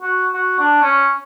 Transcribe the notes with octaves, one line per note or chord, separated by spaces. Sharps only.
F#4
F#4
D4
C#4